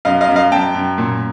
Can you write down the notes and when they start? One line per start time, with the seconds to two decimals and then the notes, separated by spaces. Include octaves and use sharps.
0.05 F#2 D#5 F5
0.21 D#5 F5
0.29 F#2
0.36 D#5 F5
0.52 F#2 G5 A5
0.75 F#2
0.98 A#2